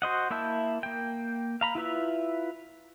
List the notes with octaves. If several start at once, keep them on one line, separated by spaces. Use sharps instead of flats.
F#4 C5 D#5 F#5
A#3 E4 E5 A5 G6
A#3 G5
F5 A#5 B5
E4 F4 B4 E5